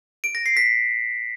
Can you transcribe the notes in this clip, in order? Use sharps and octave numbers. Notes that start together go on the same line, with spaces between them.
D7
A#6
C7
B6